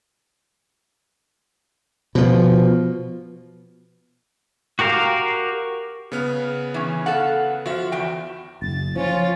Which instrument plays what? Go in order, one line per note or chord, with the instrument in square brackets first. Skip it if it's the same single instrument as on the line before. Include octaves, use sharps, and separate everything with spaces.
[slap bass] B2 F3
[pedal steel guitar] F#4 G4 A#4 F5
[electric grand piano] C#3 B3 F6
[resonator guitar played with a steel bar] E3 C#4
A4 F5 F#5
[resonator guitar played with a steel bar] F3 [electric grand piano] F#4 E5
[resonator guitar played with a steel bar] E2 G5
[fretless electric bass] F#1 [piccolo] A6
[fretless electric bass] F3 [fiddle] C#4 F4